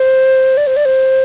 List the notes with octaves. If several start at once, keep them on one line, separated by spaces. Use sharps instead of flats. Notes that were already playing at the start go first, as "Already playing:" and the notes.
Already playing: C5
D5
C5
D5
C5